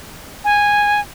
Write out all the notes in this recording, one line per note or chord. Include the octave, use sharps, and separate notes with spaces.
G#5